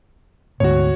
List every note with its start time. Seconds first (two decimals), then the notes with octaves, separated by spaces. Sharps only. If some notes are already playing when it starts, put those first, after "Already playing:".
0.60 D2 G#2 B2 F#4 C#5